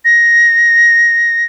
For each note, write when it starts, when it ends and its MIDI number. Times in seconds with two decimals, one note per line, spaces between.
0.05 1.44 94